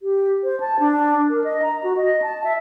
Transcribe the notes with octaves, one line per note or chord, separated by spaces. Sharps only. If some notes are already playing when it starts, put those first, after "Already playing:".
G4
C5
A5
D4
A#4
D#5
A#5
F#4
D#5
A5
E5